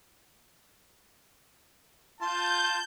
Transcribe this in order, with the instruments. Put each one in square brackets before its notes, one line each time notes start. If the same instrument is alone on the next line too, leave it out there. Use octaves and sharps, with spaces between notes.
[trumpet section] F4 A5 [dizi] C6 [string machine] G6